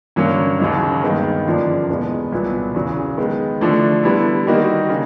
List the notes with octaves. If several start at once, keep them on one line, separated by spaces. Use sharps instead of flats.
G2 D3 F#3 A#3 C#4
D#2 C#3 F#3 A#3 D#4
G2 D#3 G#3 B3
F#2 D3 F3 A#3 D4
E2 B2 G#3 B3
C2 A#2 F#3 B3
E2 C#3 F#3
D#3 G#3 B3
D3 F3 A3 D4
D3 G3 B3 E4
D#3 G3 A#3 D#4 F#4
C#3